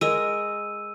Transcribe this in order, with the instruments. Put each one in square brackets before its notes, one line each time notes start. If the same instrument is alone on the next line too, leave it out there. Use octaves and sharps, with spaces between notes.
[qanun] G#3 A#4 [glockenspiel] E6 D#7